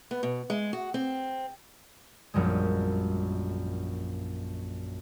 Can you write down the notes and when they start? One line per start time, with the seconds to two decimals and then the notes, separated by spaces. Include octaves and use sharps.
0.11 B3
0.23 B2
0.50 G#3
0.73 F#4
0.94 C4
2.34 A#1 F#2 G3 G#3